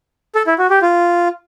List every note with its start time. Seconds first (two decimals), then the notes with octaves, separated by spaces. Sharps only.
0.35 A4
0.47 E4
0.58 F#4
0.70 G4
0.82 F4